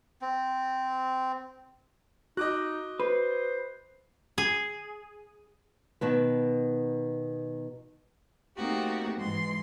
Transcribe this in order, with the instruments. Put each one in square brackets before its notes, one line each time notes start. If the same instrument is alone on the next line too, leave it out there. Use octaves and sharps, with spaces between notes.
[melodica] C4
[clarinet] D#4 [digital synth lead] F#4 [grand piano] D#5 D6 F#6
[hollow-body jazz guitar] B4 [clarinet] C5
[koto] G#4
[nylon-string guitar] B2 D#3 B4
[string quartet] A3 A#3 C4 D#4 F#4 G4
G#2 E3 G#3 C6